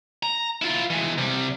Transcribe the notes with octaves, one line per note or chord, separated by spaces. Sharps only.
A#5
E4 F4
E3 G#3
C3 G3